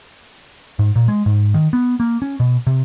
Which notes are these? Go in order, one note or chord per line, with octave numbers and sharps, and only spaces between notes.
G#2
A#2
G#3
G#2
D#3
B3
A#3
C#4
B2
C3